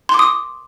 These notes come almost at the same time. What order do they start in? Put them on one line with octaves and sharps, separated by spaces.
C6 D6 D#6